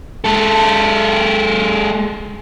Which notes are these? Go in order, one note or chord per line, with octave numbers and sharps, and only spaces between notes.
G#3 A4